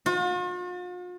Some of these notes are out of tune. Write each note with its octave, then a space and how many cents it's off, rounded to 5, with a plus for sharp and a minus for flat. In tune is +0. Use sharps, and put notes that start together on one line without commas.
F4 +45